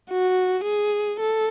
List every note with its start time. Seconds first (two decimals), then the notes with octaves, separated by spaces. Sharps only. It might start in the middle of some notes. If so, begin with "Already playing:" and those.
0.11 F#4
0.65 G#4
1.20 A4